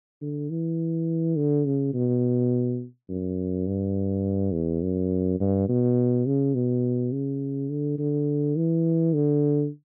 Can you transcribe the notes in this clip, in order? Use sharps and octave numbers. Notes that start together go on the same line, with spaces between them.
D3
E3
D3
C#3
B2
F#2
G2
E2
F#2
G2
B2
C#3
B2
C#3
D3
D3
E3
D3